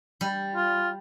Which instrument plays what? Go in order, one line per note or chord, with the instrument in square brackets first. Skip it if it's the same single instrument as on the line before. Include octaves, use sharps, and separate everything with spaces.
[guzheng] G3
[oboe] F4